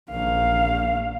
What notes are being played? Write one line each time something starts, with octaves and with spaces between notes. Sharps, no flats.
A#1 F5